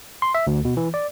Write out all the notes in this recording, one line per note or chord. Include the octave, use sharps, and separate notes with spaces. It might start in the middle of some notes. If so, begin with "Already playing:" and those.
C6
E5
D2
B2
E3
D5